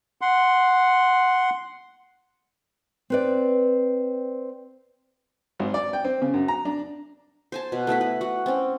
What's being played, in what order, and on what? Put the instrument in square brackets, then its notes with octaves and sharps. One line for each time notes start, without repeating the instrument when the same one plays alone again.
[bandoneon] F#5 C6
[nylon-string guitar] C4 B4 D5
[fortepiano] G#1
D5
G5
C4
C#3
F#2
A#5
D4
[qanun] C5 G#5 A5
B2
A3 B3 E4 B5
B4
F#4 F#5
C4 C#4